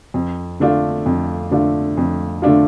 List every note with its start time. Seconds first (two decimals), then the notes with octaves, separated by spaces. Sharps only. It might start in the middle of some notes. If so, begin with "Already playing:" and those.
0.14 F2
0.60 D3 A3 D4 F4
1.06 F2
1.51 D3 A3 D4 F4
1.97 F2
2.42 D3 A3 D4 F4